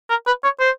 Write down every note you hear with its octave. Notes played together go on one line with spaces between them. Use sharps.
A#4
B4
C#5
C5